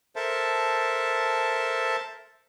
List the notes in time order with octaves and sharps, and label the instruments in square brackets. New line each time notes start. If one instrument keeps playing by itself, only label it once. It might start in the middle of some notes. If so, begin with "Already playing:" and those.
[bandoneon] A4 A#4 C5 E5 A5